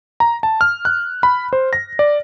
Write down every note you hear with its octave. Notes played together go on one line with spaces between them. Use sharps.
A#5
A5
F6
F#6
B5
C5
A#6
D5